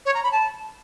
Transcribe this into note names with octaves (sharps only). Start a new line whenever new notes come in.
C#5
A#5
B5
A5